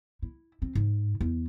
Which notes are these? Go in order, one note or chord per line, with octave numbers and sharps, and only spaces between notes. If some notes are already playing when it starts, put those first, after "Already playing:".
E4
C4
G#2
E2